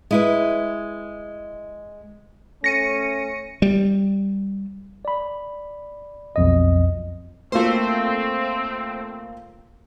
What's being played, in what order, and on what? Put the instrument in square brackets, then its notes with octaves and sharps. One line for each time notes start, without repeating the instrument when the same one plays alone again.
[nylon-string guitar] G#3 E4 B4
[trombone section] A3 C#4 [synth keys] A#6 C#7 D#7
[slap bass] G3
[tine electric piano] D5 B5
B1 F2 D#5
[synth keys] A3 C5 [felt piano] A#3 F4 [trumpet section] C4